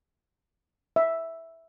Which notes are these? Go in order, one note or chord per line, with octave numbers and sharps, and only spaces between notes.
E5